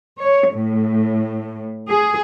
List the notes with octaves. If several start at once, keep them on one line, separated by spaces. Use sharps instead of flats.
C#5
A2
G#4